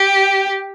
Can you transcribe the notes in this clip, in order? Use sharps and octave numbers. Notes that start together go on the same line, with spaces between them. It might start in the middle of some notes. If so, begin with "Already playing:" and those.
Already playing: G4